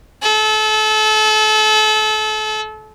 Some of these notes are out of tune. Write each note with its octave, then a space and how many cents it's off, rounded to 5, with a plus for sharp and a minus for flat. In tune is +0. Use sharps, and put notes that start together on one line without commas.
A4 -30